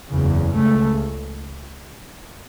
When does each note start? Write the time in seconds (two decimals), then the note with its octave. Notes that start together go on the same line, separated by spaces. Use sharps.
0.11 F#1 E2 C#3
0.55 C#2 C#3 A3